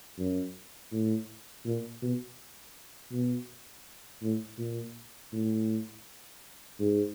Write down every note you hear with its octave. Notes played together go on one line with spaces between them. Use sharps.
F#2
A2
A#2
B2
B2
A2
A#2
A2
G#2